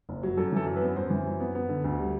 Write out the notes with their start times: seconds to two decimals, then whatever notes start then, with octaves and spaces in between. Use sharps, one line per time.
0.09 F#1
0.23 F#3
0.37 F#2 A4
0.52 E3 A4
0.66 F#2
0.76 B4
0.82 B3
0.96 F#2 C5
1.10 E3
1.26 F#2
1.40 B3
1.55 B3
1.69 D3
1.84 D2
1.98 G3